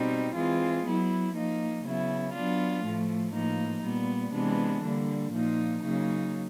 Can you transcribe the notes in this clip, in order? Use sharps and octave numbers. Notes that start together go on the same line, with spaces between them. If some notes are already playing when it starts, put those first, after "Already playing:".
Already playing: B2 G3 C4 D#4
E3 G#3 C4 F4
F#3 B3 E4
F3 A#3 D#4
C#3 F#3 B3 E4
F#3 B3 D4 F4
A2 F3 A3
A2 F3 A#3 D#4
A#2 G3 B3
C3 E3 G#3 B3 D4
D3 G3 A#3
A#2 F3 A#3 D#4
C#3 F#3 A#3 D#4